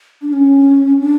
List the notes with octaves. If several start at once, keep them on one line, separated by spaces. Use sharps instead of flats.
D4
C#4
D4